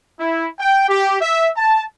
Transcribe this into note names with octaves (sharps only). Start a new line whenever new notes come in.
E4
G5
G4
E5
A5